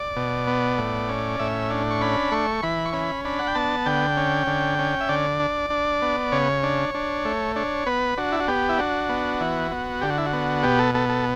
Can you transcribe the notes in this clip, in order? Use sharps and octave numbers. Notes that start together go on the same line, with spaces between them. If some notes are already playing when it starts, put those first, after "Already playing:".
Already playing: D5
B2
B3
A2
C#4
A2 E5
D4
C#6
C#4 B5
A3 C#6
E3 B5
C#6
C#4 B5
D4 B5
F#5
G5
B3 A5
D3 G5
C#4
D3
C#4
E5
D3 D5
D4
D4
B3
C#3 C#5
D4
D4
A3
D4 C#5
B3 B4
D4 F#4
E4
F#4
B3 G4
E4
D4 F#4
B3
E3
B3
D3 G4
F#4
E4
F#4
B3
B2 G4
A4
B3 A4
A4